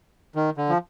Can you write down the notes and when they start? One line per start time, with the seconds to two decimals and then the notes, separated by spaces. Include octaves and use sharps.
0.35 D#3
0.57 D3
0.69 F3